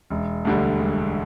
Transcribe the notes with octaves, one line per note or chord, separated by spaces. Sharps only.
E1
D2 D3 G3
E1